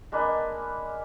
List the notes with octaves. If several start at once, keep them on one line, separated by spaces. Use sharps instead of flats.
G#3 A#3 D4 B4